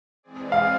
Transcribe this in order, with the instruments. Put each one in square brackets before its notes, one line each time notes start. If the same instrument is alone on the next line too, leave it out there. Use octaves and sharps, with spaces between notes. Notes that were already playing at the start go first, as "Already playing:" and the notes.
[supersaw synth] E3 G#3 C4 G#4 D5
[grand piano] F5